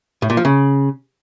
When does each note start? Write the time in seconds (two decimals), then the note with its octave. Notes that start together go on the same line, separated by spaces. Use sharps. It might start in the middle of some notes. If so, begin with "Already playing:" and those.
0.22 A2
0.30 A#2
0.37 F3
0.45 C#3